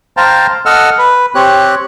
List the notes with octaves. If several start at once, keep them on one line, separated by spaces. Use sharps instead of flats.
C5 F5 G5 A5 A#5
A4 D#5 F#5 E6 F6
B4
C4 G4 C#5 F#6